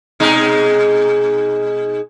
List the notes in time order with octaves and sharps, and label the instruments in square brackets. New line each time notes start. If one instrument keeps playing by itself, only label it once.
[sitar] B2 G#3 D#4